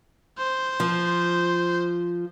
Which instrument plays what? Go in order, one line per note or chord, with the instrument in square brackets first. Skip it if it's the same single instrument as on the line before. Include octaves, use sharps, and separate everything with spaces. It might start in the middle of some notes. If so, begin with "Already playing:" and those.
[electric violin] C5
[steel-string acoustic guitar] F3